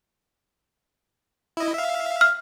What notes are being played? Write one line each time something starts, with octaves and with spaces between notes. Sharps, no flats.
E4 D#5
E5 F5
F6